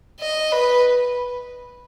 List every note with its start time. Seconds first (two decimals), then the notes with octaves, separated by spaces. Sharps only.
0.20 D#5
0.52 B4